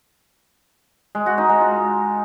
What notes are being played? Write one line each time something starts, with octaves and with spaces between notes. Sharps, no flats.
G#3
F#4
D#4
G#3
F4